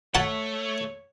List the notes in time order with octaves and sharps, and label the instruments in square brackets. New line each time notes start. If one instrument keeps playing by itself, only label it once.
[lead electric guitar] A3 [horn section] C#5 [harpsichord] F#5 A5